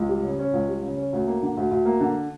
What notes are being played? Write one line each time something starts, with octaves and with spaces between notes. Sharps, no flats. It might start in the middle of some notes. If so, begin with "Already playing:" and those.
Already playing: C#2
G3
C#3
C#4
C#2
G3
C#3
C#4
D2
A#3
D3
D2
D2
A#3
D3